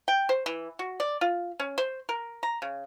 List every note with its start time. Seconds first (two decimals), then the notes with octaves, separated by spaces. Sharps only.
0.08 G5
0.29 C5
0.46 E3
0.79 F#4
1.00 D5
1.21 F4
1.60 C#4
1.78 C5
2.09 A#4
2.43 A#5
2.62 C#3